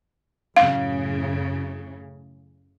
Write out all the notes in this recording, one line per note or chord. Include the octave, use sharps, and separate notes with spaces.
F#2 A2 C#3 F5